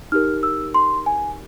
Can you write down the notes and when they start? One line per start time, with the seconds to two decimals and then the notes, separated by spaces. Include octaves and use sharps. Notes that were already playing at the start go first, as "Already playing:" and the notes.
0.12 D#4 G4 A#4 F6
0.43 E6
0.74 C6
1.06 G#5